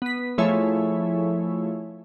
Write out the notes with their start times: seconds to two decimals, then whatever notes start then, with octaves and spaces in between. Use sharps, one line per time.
0.02 B3 B6
0.38 F3 A3 E4 G#4 C#5 E5